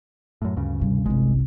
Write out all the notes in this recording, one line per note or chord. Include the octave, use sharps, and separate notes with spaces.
F#2 A2
D2 G2 C#3
C3 G3
G1 C2 G#3